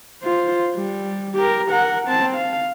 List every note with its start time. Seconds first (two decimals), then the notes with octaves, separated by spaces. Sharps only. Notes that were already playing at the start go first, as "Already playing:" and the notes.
0.23 F4 C5
0.75 G3
1.35 G4 A#4
1.70 A#4 F#5
2.07 C4 A5
2.36 F5